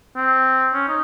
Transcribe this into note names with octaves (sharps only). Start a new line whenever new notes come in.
C4
C#4
D#4